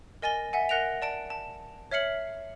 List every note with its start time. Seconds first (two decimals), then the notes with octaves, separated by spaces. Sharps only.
0.22 A#4 D#5 G#5 A6 A#6 G7
0.53 E5 F#5 G#5
0.69 A#4 F#5 F#6 A#6 D7 F7
1.02 D5 A5 D7
1.30 A5
1.91 C#5 E5 F6 C7 C#7 F#7